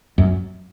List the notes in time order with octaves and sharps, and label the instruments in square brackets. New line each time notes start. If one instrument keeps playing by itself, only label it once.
[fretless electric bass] F#2